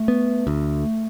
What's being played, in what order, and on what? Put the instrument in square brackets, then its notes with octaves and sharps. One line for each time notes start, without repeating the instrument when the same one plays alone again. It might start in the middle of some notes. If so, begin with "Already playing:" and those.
Already playing: [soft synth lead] A3
[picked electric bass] B3
D2